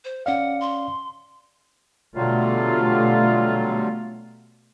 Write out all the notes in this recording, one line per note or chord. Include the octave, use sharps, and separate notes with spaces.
C5
C#4 D5 F5 F#5
C6
B2 D3 F#3 G3 A3 F4